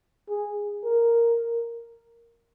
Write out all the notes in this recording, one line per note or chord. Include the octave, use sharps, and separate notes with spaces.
G#4
A#4